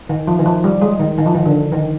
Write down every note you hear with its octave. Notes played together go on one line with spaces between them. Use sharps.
D#3
F3
D#3
F3
G3
G#3
D#3
D#3
F3
D#3
D3
D#3